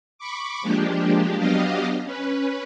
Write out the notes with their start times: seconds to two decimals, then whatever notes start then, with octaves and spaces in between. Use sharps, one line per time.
0.18 B5 C#6 D6
0.62 F3 G#3 A#3 D4 G4
1.35 F#3 B3 D4 G4 D#5 F5
2.03 C#4 B4